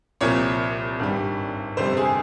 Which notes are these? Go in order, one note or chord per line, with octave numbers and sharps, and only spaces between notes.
C2 A#2 F3 C#5
G#1 G2 G3
G1 F2 C3 G3 C5
G#4